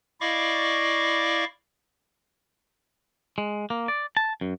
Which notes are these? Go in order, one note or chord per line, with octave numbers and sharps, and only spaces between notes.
E4 D5 D#5 F5 C#6 D6
G#3
A#3
D5
A5
F#2